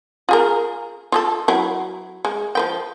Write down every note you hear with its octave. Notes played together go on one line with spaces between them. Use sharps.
F4 G#4 A#4
F4 G#4 A4
F#3 E4
G#3
F3 B4 G5